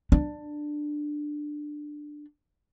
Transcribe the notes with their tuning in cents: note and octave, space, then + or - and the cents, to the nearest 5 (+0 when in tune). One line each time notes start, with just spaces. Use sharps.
D4 +15